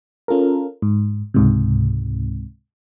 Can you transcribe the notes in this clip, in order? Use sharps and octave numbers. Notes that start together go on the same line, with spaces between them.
C#4 F4 A4 A#4
G#2
C#2 G#2 C3